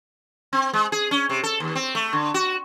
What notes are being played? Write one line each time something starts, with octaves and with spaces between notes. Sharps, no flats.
C4
G#3
G#4
C#4
C3
A4
D#2
C4
A3
D3
F#4